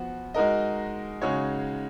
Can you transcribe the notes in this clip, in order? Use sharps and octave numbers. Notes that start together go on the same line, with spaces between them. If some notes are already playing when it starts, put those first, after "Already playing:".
Already playing: F3 B3 F#4
G#3 D#4 F#4 A#4 D#5
C#3 G#3 D#4 F#4 C#5